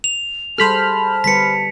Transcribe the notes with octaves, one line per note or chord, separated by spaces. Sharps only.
F7
G3 G#4 A4 C5 A5 B5 F6
D3 G3 B4 B6 C#7